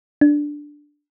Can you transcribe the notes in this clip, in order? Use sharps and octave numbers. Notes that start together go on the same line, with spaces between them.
D4